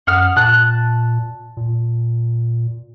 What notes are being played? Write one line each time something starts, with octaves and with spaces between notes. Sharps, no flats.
F#2 F#5 D#6 F6
A#2 A5 F#6
A#2